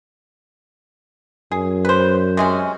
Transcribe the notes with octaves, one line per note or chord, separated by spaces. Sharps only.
F#2 G#4
B4 C5
C3 G#3 C#4